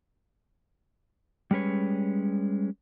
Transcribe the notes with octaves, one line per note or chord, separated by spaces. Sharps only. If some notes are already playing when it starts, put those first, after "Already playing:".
G3 G#3 C#4 B4 C#5